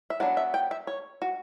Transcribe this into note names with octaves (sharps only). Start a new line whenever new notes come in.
E5
F#3 B3 D4 F#5
E5
G5
E5
C#5
F#4